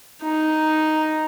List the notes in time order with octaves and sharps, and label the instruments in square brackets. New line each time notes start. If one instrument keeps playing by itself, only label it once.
[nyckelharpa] D#4